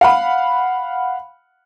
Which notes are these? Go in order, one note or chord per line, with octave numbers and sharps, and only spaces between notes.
F5 F#5 B5